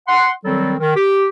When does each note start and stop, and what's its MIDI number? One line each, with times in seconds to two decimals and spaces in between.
0.08 0.31 78
0.08 0.31 84
0.45 0.73 51
0.45 0.73 54
0.45 0.73 55
0.45 0.73 60
0.45 0.73 69
0.79 0.94 51
0.96 1.26 67